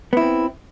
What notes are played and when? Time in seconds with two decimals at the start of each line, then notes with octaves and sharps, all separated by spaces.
0.13 B3
0.17 E4
0.21 C4